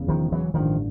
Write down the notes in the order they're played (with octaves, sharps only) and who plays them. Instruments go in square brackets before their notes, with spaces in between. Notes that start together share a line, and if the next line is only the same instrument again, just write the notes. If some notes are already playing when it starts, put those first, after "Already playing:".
Already playing: [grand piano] E1 E2 C#3
[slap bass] D#3 F3
E3 F#3
[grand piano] A1 G2 D3 [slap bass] D#3 F3